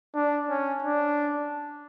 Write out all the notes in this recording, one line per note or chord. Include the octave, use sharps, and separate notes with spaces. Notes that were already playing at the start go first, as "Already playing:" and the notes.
D4
C#4
D4